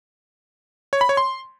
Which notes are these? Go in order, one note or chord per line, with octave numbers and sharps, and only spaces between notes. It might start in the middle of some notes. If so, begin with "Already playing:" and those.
C#5
B5
C#5
C6